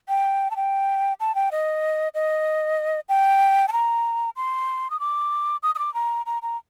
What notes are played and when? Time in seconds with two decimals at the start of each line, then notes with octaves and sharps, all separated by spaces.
0.09 G5
0.51 A5
0.56 G5
1.20 A5
1.35 G5
1.52 D#5
2.15 D#5
3.09 G5
3.68 A5
3.73 A#5
4.37 C6
4.90 D#6
5.00 D6
5.63 D#6
5.75 D#6
5.79 D6
5.94 A#5
6.26 A#5
6.42 A#5